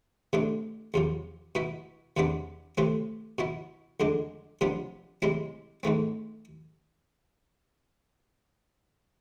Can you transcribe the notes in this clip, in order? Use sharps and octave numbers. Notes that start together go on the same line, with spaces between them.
C3 E3 A3 D4
E2 C3 F3
B2 B3 E4
E2 C3 E3 B3 D4
C3 E3 A3 C4
B2 B3 E4
F2 D3 G#3 D4
C3 F3 B3 D4
C3 G#3 C4 E4
G#2 E3 A3 C4